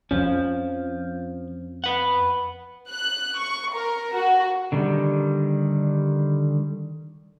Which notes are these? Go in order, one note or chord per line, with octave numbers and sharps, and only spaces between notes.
F2 F3 C#4
B4 F#5
F#6
C#6
A#4
F#4
D3 D#3 G3